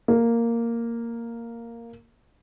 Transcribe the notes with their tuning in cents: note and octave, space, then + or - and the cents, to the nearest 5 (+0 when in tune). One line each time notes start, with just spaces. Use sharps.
A#3 -5